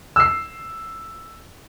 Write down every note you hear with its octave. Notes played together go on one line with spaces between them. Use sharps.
E6 C7